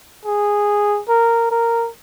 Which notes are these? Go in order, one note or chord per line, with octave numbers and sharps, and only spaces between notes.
G#4
A#4
A#4